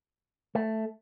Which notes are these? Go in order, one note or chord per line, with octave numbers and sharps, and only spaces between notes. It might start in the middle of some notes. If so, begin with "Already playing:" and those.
A3